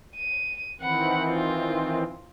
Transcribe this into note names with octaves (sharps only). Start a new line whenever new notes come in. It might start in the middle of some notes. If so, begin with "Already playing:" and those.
D#7
D#3 E3 C4 F#5 B5
F4